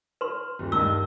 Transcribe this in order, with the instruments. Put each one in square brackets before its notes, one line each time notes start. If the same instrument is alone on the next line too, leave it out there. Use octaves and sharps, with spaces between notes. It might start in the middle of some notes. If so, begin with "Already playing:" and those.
[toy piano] B4 C6
[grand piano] D#1
[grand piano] G2 D#3 G7 [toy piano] E6